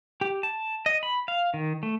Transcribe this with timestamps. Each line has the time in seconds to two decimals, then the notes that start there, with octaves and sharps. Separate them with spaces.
0.21 G4
0.43 A5
0.86 D#5
1.03 B5
1.28 F5
1.54 D#3
1.83 A3